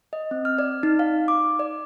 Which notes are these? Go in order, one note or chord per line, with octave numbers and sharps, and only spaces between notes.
D#5
C4
F6
D5
D#4
F5
D6
D5